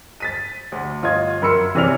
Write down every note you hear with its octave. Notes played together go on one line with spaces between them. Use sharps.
A6 B6 D#7
D2
G1 F4 D#5 G#6
F#2 A#4 B5 C6 E6 C#7
C3 E3 C#4 D5 F6 F7